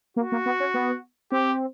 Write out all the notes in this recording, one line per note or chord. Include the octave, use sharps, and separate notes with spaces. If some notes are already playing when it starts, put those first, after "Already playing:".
A#3 F#4
A#3
B3
C#4
B3
C4 G4